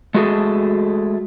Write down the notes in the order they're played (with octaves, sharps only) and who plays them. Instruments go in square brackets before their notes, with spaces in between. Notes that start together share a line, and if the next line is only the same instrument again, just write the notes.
[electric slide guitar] G#3 A3 F#4 G#4 A4